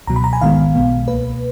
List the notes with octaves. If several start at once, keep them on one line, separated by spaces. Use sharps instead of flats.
C#2 B2 F#3 A#5
B5
A#5
G#5
G#1 G#2 D#3 G#3 B3 F5
B1 B2 G#3 B3
C#2 B2 A#3 B4